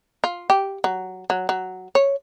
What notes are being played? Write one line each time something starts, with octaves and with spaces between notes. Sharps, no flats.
F4
G4
F#3
F#3
F#3
C#5